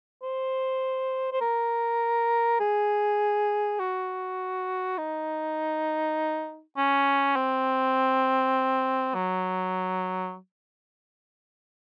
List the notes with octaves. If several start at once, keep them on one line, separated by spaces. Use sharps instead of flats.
C5
C5
A#4
G#4
F#4
D#4
C#4
C4
F#3